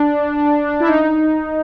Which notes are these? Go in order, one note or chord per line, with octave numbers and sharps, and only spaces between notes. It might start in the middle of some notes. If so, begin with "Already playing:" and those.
Already playing: D4
E4
D#4